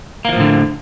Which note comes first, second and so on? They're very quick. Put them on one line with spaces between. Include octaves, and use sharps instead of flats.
A#3 E3 F3 A2 D3